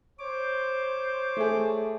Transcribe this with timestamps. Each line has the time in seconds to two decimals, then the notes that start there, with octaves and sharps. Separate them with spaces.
0.19 C5 C#5 D6
1.37 A3 G#4